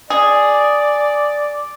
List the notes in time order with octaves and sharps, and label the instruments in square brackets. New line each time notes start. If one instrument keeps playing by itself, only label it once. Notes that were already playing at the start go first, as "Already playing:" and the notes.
[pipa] G#4 [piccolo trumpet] D5